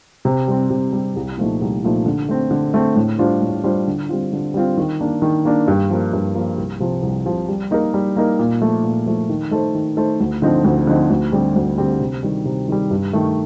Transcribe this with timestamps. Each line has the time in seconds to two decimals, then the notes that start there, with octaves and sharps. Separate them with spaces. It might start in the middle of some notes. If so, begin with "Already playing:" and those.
0.25 C3
0.48 G3 C4
0.70 C3
0.93 G3 C4
1.16 C2
1.38 A#2 F3 A3 D#4
1.62 C2
1.84 A#2 F3 A3 D#4
2.06 D3
2.29 A3 C4
2.51 D3
2.74 A3 C4
2.96 A2
3.18 G3 D4 F4 C5
3.42 A2
3.64 G3 D4 F4 C5
3.87 D3
4.09 G3 C4 F4
4.33 D3
4.54 G3 C4 F4
4.77 D#3
5.00 A#3 D4
5.22 D#3
5.45 A#3 D4
5.68 G2
5.90 F3 A#3
6.13 G2
6.35 F3 A#3
6.57 C2
6.80 C3 F3
7.03 C2
7.26 C3 F3
7.48 G3
7.71 A#3 D#4 A#4
7.94 G3
8.16 A#3 D#4 A#4
8.39 A#2
8.62 F3 A3
8.84 A#2
9.06 F3 A3
9.29 D#3
9.51 A3 D#4 A4 C5
9.74 D#3
9.97 A3 D#4 A4 C5
10.20 D2
10.42 D3 F3 C4 D#4
10.64 D2
10.87 D3 F3 C4 D#4
11.10 D2
11.32 D3 G3 C4 G4
11.56 D2
11.78 D3 G3 C4 G4
12.00 C3
12.23 D#3 G3
12.45 C3
12.68 D#3 G3
12.91 G2
13.13 D#3 A3